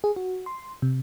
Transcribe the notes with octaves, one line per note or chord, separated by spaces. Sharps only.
G#4
F#4
C6
C3